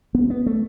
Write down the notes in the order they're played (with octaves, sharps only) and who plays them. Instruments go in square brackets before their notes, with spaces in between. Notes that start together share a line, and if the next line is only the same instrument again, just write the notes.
[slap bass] B3
B3
A3